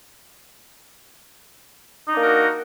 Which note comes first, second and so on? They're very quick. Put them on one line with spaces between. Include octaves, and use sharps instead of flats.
D#4 D4 A#3 A#4 F#4